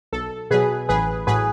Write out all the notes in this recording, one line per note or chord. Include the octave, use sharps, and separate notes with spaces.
B1 A4
B2 F#3 G#4 B4
A1 G#4 B4
A2 F#3 G#4 B4